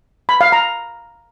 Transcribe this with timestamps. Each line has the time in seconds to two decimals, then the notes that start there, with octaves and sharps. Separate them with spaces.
0.29 B5
0.41 F5
0.52 A#5